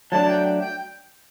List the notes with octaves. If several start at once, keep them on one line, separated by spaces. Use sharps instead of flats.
F#3 A3 D4 A5
G5
G5